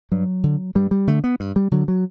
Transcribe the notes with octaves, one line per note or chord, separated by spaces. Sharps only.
G2 F#3
D3
G2 G3
G3
D3 A3
B3
G2
G3
D3 F#3
F#3